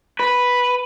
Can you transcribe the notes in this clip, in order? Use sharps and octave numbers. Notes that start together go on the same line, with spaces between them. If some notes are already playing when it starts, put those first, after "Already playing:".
B4